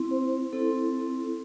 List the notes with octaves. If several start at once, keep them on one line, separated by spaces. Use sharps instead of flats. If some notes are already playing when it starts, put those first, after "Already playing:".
Already playing: C4 E4
C5
C4 E4 A4